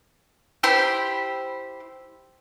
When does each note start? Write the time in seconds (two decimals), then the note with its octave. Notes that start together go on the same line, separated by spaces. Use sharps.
0.63 E4 G4 C5 B5